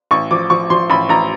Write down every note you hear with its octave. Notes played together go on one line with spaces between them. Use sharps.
A1 C#6
F3 D6
F3 C#6
F3 C6
A1 B5
A1 A#5